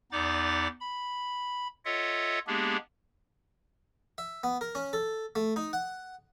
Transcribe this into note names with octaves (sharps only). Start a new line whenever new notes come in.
E2 B3 D#4 D5 D6 A6
B5
F4 A4 C#5 D#5 E5 F#5
G#3 A#3 B3 D4 G4 G#4
E5
B3
A#4
C#4
A4
A3
D#4
F#5